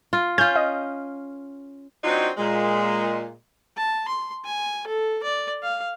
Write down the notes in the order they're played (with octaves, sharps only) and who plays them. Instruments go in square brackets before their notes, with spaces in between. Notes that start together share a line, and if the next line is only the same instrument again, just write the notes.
[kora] F4
[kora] C#4 F4 [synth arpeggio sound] G6
[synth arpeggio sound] D#5
[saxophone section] F#3 C4 D4 D#4 F4 F#4
A#2 G#3
[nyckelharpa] A5
C6
G#5
A4
D5
F5